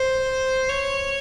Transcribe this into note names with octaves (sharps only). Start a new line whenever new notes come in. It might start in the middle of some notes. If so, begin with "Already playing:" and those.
Already playing: C5
C#5